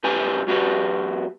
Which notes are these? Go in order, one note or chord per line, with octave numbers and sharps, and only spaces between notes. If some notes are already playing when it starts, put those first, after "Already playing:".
C2 F#2 G4 B4 G#5
E2 F#3 F#4 G4 B4